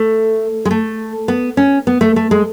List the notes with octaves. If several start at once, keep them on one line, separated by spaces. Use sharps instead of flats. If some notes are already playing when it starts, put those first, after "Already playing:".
Already playing: A3
G#3
A3
B3
C#4
B3
A3
A3
G#3